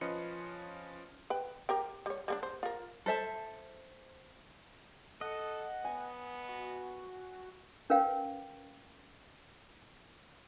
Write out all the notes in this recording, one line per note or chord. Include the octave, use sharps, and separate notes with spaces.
F3 C#4 B4 D#5 C6 C#7
B4 G5
G4 A#4 G5
G3 C#5
G3 A#3 D4
C5
F4 A#4
A4 C5 E5 A5
A4 D#5 F#5
B3 G#5
F#4
C#4 A#4 B4 F5 G5